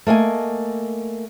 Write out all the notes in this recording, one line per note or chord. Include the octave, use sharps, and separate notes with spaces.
A3 A#3 D#5 G#5